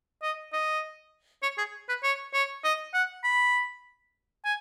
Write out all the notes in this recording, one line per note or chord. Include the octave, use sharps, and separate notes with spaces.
D#5
D#5
C#5
G#4
B4
C#5
C#5
D#5
F#5
B5
G#5